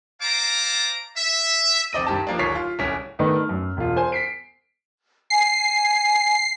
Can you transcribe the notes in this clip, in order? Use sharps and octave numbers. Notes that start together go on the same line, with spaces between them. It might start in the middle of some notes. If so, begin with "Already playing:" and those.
C5 F5 A5 A#5 D6
E5
F1 C4 D5 D#5 A#6 D#7
G2 D#3 G4 A5
F3 A#3 D4
D1 D#2 C#5 B6 C7
F4
D1 C2 C#4 B6
D#3 A3 B3 D4 D#4
F6
F#2
E1 F4
C5 G#5
B6 C7 D7
G#5 C7